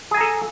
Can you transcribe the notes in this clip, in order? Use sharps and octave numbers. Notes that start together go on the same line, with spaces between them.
G#4 A4 G#5 A#5